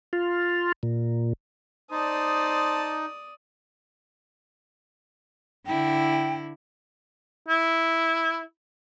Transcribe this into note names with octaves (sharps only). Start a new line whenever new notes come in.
F4
A#2
D#4 C5 D5 A5 D#6
D3 E4 G5
E4